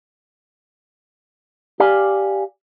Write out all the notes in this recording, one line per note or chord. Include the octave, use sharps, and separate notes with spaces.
G4 D5 F5 G#5